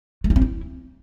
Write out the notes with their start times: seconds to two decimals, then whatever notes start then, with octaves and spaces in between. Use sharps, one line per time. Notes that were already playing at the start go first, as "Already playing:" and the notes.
0.24 A3
0.30 E4
0.36 C4
0.42 E4